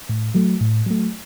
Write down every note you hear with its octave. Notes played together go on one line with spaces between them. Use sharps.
A2
F#3 A3
A2
F#3 A3